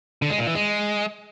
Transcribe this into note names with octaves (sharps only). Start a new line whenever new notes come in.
D3
G#3
A#2
E3
G#3